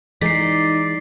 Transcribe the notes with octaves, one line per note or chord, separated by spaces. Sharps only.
E3 G#3 D#4 D5 B6 C7